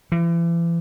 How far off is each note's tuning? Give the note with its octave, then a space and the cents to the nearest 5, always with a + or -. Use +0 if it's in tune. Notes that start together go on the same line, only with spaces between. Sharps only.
E3 +40